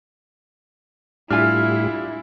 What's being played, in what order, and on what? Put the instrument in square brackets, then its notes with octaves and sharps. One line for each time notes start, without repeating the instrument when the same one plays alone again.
[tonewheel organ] A2 G3 [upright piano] D4 F4 E5 [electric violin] E4 [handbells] G#5 F6